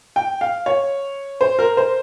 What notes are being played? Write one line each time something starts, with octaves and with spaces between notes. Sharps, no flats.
G5
F5
C#5
C5
A#4
C5